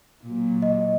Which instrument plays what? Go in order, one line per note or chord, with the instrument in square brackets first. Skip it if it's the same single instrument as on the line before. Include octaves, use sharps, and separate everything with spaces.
[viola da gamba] A#2 F#3
[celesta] D#5